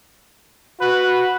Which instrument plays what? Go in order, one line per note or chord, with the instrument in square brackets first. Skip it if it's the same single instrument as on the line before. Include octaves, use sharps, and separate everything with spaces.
[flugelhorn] F#4 [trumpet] B4